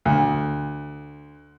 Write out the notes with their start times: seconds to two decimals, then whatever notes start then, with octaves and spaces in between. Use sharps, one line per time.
0.05 D2